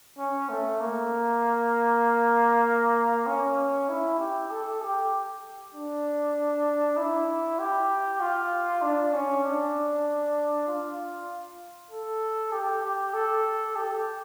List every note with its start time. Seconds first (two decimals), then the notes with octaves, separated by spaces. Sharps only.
0.19 C#4
0.49 A3
0.80 A#3
3.27 C#4
3.89 E4
4.19 G4
4.51 A4
4.81 G4
5.74 D4
6.97 E4
7.59 G4
8.20 F4
8.82 D4
9.13 C#4
9.44 D4
10.68 F4
11.90 A4
12.52 G4
12.83 G4
13.14 A4
13.76 G4